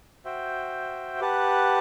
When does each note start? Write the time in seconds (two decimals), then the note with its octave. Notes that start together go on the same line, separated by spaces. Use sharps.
0.25 F#4 C5 E5 G5
1.20 G4 B4 F#5 A5